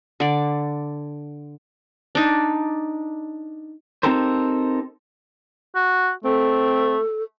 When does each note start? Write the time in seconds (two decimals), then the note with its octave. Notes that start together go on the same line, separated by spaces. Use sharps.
0.20 D3 D5
2.15 D4 D#4
4.03 C4 D#4 G4 A4 A#4 C5
5.75 F#4
6.24 A3 C4 A4